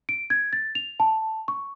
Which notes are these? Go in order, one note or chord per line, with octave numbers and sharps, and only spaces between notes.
D7
G#6
A6
F7
A5
C#6